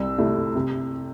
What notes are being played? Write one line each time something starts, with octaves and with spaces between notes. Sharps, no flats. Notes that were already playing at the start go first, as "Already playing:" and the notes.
Already playing: C2 E6
C3 A3 E4
C3